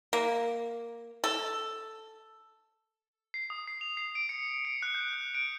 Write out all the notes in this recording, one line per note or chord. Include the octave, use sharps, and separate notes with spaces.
A#3
A4
C7
D#6
C7
F7
C7
D7
C#7
D7
F#6
G6
F#6
D7